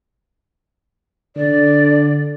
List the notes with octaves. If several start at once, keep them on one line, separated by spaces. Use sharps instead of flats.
D3 D5